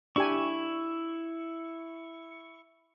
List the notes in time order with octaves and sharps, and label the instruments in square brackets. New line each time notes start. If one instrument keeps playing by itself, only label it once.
[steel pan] D4 G4 G#5 [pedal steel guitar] E4 C#6